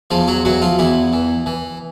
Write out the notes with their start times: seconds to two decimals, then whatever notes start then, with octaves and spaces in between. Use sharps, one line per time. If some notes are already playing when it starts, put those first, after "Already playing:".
0.11 E2 F3 F4
0.28 F#3 F#4
0.45 E3 F#3 F#4
0.62 F3 F4
0.79 E2 E3 E4
1.13 E3
1.46 E3